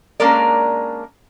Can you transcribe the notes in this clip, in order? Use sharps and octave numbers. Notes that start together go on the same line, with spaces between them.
G#3 A#3 C#4 D4 A#4 D5